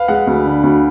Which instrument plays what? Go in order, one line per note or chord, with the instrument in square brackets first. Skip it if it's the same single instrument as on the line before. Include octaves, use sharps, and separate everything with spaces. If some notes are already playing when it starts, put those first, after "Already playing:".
Already playing: [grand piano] B4 F5
[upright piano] G#3 [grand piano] F#5
[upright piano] D2
D3
D2